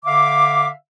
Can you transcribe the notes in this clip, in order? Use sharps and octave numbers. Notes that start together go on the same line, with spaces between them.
D3 E5 F5 D6